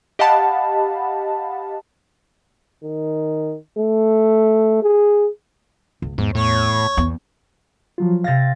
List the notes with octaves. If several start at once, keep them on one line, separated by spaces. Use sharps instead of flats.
G4 D#5 F5 F#5 A5 B5
D#3
A3
G#4
C#2
E2 G#2
A2 C#5
E2
F3 F#3 F4
C3 F5 A6 A#6